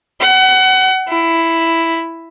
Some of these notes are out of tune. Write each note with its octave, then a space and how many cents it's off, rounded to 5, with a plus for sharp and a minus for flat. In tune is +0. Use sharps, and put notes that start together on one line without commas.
F#5 +30
E4 +5